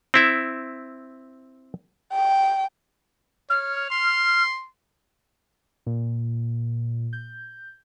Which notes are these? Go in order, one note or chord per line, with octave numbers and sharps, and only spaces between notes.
C4 E4 E5
G5
C#5 F6
C6
A#2
G6